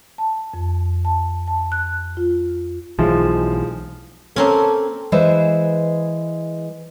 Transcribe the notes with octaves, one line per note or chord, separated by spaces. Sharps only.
A5
F2
A5
A5
F#6
F4
B1 E3 F3 G#3
A#3 C4 C#4 A4
E3 G#3 B4 C5 E5